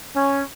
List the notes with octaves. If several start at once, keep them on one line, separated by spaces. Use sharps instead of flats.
C#4